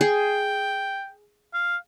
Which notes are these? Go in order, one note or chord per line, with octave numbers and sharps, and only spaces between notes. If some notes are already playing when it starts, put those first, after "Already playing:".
G#4 G5
F5